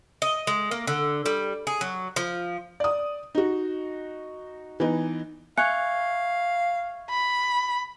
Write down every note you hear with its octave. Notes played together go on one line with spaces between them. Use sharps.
D#5
G#3
A#3
D3
G3
G#4
F#3
F3
D5 D#6
D#4 F#4
E3 B3 D#4
E5 F5 G#5 C#6 F#6 G#6 C#7
B5